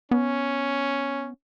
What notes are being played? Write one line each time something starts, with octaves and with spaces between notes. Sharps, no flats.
B3 C#4